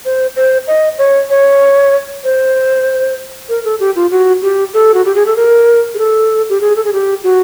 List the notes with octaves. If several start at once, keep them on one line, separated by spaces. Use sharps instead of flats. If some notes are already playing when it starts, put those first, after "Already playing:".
C5
C5
D#5
C#5
C#5
C5
A#4
A4
G4
F4
F#4
G4
A4
F#4
G4
G#4
A4
A#4
G#4
A4
G4
G#4
A4
G#4
G4
F#4